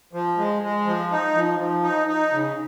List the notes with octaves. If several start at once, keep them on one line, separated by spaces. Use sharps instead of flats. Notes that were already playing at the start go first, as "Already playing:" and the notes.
F3
G#3
G#3
F3
D#4
F3
F3
D#4
D#4
C#3